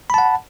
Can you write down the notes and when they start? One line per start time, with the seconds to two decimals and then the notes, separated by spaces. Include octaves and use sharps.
0.10 B5
0.14 A5
0.18 F#5